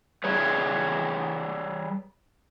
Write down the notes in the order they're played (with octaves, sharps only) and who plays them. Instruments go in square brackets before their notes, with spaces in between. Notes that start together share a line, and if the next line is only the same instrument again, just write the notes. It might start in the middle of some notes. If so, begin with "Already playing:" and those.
[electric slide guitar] G3 G#4 B4 C#5